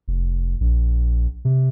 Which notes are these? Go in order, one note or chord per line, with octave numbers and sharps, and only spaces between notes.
F1
A#1
C3